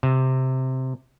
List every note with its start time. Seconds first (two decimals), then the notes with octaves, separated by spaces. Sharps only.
0.03 C3